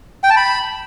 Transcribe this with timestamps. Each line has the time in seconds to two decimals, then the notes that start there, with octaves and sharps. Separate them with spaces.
0.24 G5
0.30 A5
0.37 B5